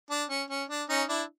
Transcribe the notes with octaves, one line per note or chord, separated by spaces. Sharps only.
D4
C#4
C#4
D4
C#4 D#4
D4 E4